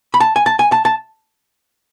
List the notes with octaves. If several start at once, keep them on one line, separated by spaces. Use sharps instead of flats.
B5
A5
G#5
A5
G#5
A5
A5